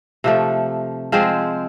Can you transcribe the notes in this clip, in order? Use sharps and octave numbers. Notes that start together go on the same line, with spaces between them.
C3 F3 A3
F3 G#3 C4